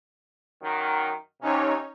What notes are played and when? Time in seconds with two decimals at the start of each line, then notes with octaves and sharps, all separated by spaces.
0.62 F#2 D#3
1.41 D#2 C3 C#4 D#4 C#5